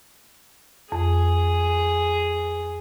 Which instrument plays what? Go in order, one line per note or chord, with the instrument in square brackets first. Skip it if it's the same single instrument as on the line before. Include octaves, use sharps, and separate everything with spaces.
[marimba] F2 [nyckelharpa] G#4